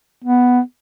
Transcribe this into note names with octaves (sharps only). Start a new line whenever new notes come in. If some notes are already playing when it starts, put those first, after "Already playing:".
B3